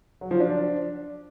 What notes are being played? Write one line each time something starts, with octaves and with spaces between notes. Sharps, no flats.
F#3
F3
D4